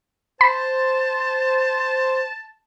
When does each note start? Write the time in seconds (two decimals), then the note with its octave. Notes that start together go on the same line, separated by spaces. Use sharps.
0.41 C5 A5 B5